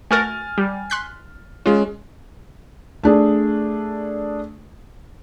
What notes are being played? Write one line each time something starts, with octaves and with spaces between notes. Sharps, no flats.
A3 F#4 A#4 G#5 F6 A6
G3
C6 F#6 B6
G#3 C#4 F4
A3 D4 G#4